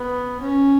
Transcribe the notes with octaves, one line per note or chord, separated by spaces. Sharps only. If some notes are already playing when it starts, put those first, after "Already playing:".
Already playing: B3
C#4